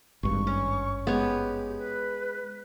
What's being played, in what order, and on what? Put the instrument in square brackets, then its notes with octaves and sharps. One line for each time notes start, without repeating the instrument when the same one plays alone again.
[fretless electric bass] G#1 G2 [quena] C#6
[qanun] C#4
[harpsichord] G#3 [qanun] B3 C#5 [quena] G4
[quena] B4